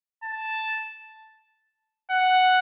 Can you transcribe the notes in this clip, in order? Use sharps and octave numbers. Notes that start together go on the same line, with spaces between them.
A5
F#5